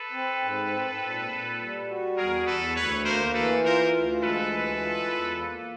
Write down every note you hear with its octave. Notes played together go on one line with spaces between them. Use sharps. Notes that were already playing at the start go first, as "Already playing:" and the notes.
Already playing: A4 B4
C4
G#2
C4
A#2
A#2
G3
F#4
E2 G#4 A#4
E2 A4 B4
D2 B4 C#5
A#3 A#4 C5
E3 A4 B4
F4 A#4 C5
D2
G#3 A4 B4
E3
F4
E2
A#3